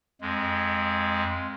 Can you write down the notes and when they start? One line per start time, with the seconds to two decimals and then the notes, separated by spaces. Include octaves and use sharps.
0.21 F2 G#3